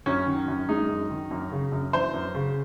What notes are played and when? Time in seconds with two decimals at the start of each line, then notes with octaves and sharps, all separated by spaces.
0.06 F#2 C#4
0.27 D#3
0.48 F#2
0.69 G#3 D#4
0.89 F#2
1.10 D#3
1.31 F#2
1.52 C#3
1.72 F#2
1.93 E3 C5
2.14 F#2
2.35 C#3